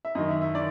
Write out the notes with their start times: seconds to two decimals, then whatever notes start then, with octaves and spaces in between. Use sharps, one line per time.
0.05 E5
0.15 F#2 D#3 D#5
0.29 E5
0.41 E5
0.55 D#3 D5